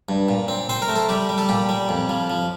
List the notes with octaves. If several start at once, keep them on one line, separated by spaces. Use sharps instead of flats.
G2
A#2
C4
C4 C5
A#4
A3
A4
G3 G4
G3
A4
A#2 G4
G3
F2
F3
F3